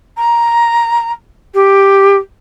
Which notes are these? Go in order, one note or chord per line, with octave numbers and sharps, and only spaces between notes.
A#5
G4